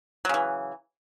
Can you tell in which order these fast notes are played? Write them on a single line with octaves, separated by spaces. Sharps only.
F#3 C#3 E3